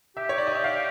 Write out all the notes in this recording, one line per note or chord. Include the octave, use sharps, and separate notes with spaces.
G4 E5
C#5
D5
D#5
E5
F5